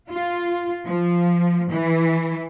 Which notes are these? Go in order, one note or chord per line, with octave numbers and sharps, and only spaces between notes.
F4
F3
E3